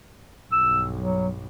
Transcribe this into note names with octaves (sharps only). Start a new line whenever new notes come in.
B1 G2 E6
F#3